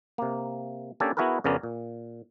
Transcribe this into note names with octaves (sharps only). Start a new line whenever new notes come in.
C3 A#3
A#3 C#4 D4 G4 A4 G#5
B3 E4 F#4 G#4 A#4 B4
F2 C#3 B3 C#4 A#4 D5
A#2